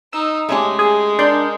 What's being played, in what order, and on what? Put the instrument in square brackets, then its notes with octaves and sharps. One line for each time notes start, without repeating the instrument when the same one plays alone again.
[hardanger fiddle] D#4 [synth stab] E6
[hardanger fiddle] G#3 [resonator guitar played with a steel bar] A3 C#4 G4
[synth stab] G#4
[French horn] D4 [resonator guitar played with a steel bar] A#4 [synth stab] D5 C6 G6